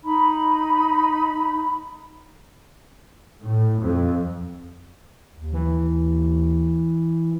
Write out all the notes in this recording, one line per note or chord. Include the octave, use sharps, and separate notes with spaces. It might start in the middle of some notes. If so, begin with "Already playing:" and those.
D#4 B5
A2
F2
D#2
E3